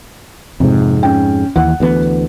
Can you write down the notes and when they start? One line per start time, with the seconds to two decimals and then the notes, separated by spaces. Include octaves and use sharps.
0.60 F2 G#2 C3
1.03 C#4 G5
1.56 D#2 E3 F#5
1.80 D2 E3 B3